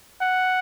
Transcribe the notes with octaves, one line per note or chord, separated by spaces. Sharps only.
F#5